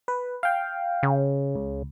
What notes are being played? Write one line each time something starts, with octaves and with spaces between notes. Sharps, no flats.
B4
F5 G5
C#3
C#2